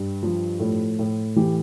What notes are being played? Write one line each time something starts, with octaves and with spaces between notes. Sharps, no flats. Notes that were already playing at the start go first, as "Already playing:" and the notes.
Already playing: G2
F3
A2
A2
E3 G4